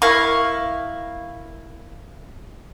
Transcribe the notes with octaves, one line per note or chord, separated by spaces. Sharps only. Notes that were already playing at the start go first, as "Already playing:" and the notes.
E4 A#4 F5 C#6